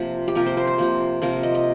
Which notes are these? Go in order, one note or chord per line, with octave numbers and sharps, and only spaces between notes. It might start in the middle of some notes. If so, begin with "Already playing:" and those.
Already playing: C3 F3 A#3
G4
C3 F3 A#3 A#4
C5
C5
C5
C3 F3 A#3
C3 F3 A#3 A#4
D#5
D#5